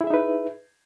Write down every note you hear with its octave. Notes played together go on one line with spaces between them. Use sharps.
D#4 E4 G#4 B4 E5